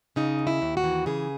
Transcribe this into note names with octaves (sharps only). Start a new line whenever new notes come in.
C#3 D#4
D#2
E4
D#2
F#4
E3
C#3 G#4